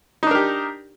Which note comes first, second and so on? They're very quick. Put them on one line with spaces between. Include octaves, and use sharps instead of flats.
D#4 D4 A#4 G4